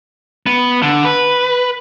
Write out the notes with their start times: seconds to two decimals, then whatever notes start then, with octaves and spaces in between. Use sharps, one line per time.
0.46 B3
0.82 D3
1.05 B4